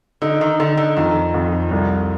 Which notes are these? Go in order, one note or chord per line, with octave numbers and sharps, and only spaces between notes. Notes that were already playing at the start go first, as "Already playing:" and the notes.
D3 D#4
D#3
D3 D#4
D3
F2 D#3
F2
C2